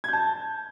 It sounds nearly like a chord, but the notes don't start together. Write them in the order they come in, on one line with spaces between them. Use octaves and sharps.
G#6 G6 A5